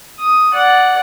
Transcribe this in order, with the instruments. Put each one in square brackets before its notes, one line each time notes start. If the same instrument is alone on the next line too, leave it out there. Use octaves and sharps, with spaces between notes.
[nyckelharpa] D#6
D5 F#5